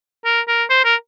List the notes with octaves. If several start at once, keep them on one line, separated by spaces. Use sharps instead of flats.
A#4
A#4
C5
A#4